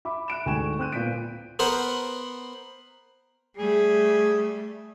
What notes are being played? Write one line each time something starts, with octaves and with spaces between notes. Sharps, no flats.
E5 B5 D6
F#6 D7 E7
D2 G#2 G5 G#5 C#6 E7
C4 F#6 D#7
A#2 B3 G6 B6 D7
B3 A#4 C5 F#5
G3 A3 G#4